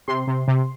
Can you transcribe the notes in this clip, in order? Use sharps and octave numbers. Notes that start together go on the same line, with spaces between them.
C3 C6
C3
C3